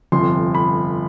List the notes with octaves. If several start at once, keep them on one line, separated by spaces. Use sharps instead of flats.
G1 F2 C3 C6
B5